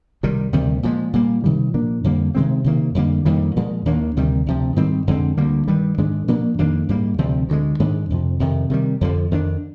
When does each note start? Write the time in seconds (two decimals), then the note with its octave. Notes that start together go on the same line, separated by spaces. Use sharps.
0.23 C2 C3 D#3 G3
0.53 D2 C3 D#3 G3
0.83 A#2 F3 G#3
1.13 A#2 G3 A#3
1.44 C3 D#3 G3
1.74 A#2 F3 A#3 D4
2.04 F2 D3 G3 A#3
2.35 C3 D#3 G#3 C4
2.64 C3 D#3 A#3
2.95 F2 D3 G3 A#3
3.25 F2 D#3 G3 A#3
3.56 A#2 F3 G#3
3.86 D#2 D#3 A#3 D4
4.16 D2 C3 D#3 G3
4.47 D2 C3 F3
4.76 G#2 D#3 G3 C4
5.07 F2 D3 G#3 C4
5.37 D2 D3 G3 A#3
5.68 G2 D#3 G3
5.98 G#2 D#3 G#3 D4
6.28 A#2 F3 A#3 D4
6.58 F2 D#3 A#3 D4
6.89 G#2 G3 A#3
7.18 D2 C3 F3 C4
7.49 D2 D3 G#3
7.80 G#2 D#3 G#3 D4
8.10 F2 C3 F3
8.40 F2 C3 D#3
8.70 C3 D#3 G3
9.01 F2 D3 F3
9.31 F2 D#3 G#3 D4